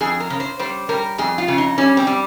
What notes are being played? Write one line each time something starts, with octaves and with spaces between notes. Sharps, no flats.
F2 G#4
A#4
C#3
C5
G3 C5
G3 A#4
F2 G#4
F4
C#3
D#4
G3 C#4
C4
G3